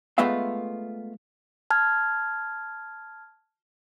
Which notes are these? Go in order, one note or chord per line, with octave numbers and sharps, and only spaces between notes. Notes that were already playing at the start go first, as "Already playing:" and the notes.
G#3 A3 B3 F4 E5 F5
A5 F6 G#6